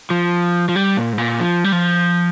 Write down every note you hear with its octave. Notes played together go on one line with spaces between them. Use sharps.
F3
F3
G3
A#2
G#2
A#2
F3
G3
F3